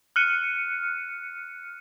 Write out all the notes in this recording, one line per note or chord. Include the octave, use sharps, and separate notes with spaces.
F6 F#6 C#7 D#7